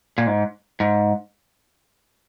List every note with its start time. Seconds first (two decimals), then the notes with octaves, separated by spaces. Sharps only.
0.18 A#2
0.27 G#2
0.80 G#2